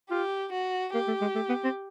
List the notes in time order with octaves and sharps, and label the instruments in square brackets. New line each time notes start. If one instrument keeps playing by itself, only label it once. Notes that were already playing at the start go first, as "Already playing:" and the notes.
[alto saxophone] F4 [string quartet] G4
[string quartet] F#4
[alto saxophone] A#3 [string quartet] G4
[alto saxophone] A3
G#3
A3
B3
C4